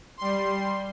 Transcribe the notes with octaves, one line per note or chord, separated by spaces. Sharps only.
G3 C6